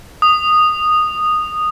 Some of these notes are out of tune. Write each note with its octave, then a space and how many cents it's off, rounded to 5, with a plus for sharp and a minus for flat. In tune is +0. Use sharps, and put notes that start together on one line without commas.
D#6 -10